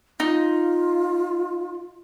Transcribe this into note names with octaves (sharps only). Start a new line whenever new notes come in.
D#4 F4